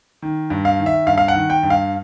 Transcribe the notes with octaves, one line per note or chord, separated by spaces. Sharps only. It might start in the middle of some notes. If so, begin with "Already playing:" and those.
D#3
G2
F5
D#3
E5
G2 F5
F5
F#5
D#3
G5
G2
F5